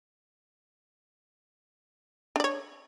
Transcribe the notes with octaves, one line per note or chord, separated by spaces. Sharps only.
D4 C#5 D5